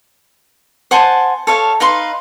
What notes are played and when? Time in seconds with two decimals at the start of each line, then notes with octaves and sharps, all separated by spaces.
0.91 C5 F#5 G#5 A5
1.47 A4 C#5 F5
1.80 D#4 B4 F5 C6